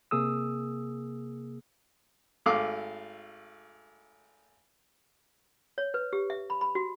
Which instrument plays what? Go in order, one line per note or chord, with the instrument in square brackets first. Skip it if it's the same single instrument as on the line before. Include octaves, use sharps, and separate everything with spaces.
[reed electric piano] C3 A#3 G#4 D#6 E6
[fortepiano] G#1 A3 F5 D6
[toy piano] C#5
B4
G4
E5
B5
B5
F#4